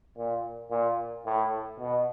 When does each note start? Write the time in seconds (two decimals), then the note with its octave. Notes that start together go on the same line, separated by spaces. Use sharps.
0.17 A#2
0.70 A#2
1.26 A2
1.79 B2